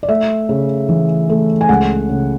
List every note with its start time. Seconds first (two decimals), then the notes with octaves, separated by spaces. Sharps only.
0.03 D5
0.09 A3 E5
0.49 C#3
0.89 E3
1.29 A3
1.61 G#5
1.69 C#2 F#5
2.09 C#3